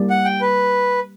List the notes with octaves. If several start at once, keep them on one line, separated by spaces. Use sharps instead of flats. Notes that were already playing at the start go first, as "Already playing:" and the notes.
Already playing: G3 A#3 E4 D5
F#5
G5
B4